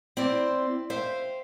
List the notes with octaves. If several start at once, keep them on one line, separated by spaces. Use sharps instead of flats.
C4 E4 C5 D5
C5 E5 F5 G5